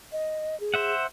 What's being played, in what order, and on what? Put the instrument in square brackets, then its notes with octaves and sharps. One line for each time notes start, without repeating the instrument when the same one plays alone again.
[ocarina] D#5
G#4
[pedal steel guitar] C5 E5 F#5